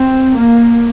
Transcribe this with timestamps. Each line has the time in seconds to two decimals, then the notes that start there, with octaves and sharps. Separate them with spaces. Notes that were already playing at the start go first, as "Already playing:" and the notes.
Already playing: C4
0.36 A#3